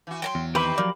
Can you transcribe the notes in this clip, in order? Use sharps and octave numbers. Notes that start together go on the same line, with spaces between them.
E3 F#4
F#3 G5 A#5 C6
E2
D#3 C4 G4 B4 E5 B5 D6
F3 F#3 A#3 D5